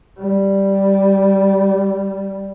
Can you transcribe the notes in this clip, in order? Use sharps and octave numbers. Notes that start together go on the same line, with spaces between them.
G3